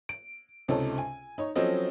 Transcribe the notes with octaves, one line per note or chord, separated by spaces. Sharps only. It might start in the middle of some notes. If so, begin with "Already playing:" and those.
D7
C#2 C3 D#4 A4 C#5 A5
G#5
D#4 C#5
F3 F#3 C4 C#4 A4 D#5